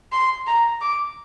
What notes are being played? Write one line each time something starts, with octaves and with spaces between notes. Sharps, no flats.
C6
A#5
D6